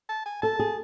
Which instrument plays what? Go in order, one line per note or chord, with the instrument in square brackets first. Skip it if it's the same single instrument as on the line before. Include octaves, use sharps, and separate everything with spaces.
[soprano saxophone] A5
G#5
[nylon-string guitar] A4 [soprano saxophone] A5
[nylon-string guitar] G#4